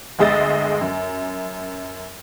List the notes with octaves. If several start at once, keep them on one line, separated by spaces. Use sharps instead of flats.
G1 D2 G#3 D#5 E5 A6
F#2